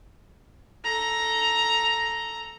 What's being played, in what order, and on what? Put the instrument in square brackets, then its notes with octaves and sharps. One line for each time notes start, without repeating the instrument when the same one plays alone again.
[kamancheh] A4 A#5